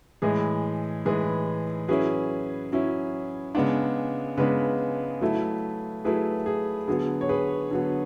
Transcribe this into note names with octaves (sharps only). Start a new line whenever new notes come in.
A2 E3 G#3 G#4
A2 E3 G#3 G#4 B4
F#3 C#4 E4 G#4 B4
F#3 C#4 E4
C#3 G#3 B3 D4
C#3 G#3 B3 D4 G#4 B4
F#3 A3 E4
F#3 A3 E4 G#4 B4
G#4
D3 F#3 B3 G#4
C#5
G#4 B4
D3 F#3 B3